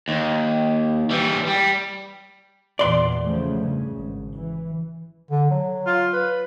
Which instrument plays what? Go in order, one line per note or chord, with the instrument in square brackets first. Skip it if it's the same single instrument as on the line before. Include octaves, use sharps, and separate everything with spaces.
[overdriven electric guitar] D#2
E3 G3
G3
[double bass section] E2 A#2 E3 [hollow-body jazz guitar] D5 C6
[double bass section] C#3 F3 A3
G2 C#3
G#1
E3
[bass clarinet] D3
F#3
[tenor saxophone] F4
B4